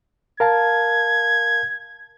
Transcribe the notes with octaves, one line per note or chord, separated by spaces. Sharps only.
A#4 F5 A5 G#6